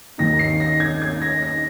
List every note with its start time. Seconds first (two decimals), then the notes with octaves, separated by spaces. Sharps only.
0.18 D#2 D#3 A#3 D#4 A#6
0.39 C7
0.60 A#6
0.80 G#6
1.02 G#6
1.22 A#6
1.43 A#6